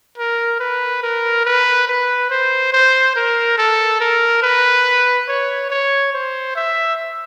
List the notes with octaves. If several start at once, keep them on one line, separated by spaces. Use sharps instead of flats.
A#4
B4
A#4
B4
B4
C5
C5
A#4
A4
A#4
B4
C#5
C#5
C5
E5